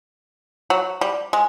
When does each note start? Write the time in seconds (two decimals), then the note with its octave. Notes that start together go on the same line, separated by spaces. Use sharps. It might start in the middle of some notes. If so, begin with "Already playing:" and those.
0.70 F#3
1.01 G3
1.33 G#3